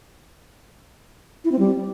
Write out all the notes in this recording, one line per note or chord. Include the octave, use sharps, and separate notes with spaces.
E4
C4
G3